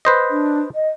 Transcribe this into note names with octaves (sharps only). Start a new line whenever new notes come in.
B4 C5 D#5
D4
D#5